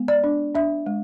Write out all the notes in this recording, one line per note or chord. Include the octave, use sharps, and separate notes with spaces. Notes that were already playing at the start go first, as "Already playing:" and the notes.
Already playing: G#3 B3
D5
D4
D4 E5
G#3